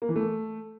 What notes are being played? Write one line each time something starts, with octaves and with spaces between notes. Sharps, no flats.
A#3
E3
A3